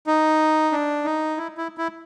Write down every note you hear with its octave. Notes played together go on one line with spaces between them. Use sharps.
D#4
D4
D#4
E4
E4
E4